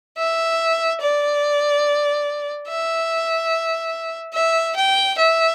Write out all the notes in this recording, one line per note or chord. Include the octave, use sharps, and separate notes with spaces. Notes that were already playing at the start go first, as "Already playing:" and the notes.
E5
D5
E5
E5
G5
E5